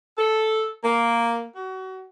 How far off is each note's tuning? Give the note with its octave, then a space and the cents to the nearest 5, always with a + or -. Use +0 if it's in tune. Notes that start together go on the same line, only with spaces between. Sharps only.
A4 -5
A#3 +0
F#4 +30